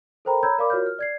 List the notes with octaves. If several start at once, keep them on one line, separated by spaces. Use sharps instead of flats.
A4 A#4 C5 G5 A#5 B5
C#5 A#5 B5 E6 G6 G#6
A#4 D5 F5 B5 D6
F4 F#4 A#4 C#5 F6 G6
F6
D5 G#6 C7